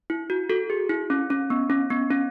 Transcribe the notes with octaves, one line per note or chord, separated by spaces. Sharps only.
E4
F#4
F#4 A4
G#4
E4
C#4
C#4
B3
C#4
B3
C#4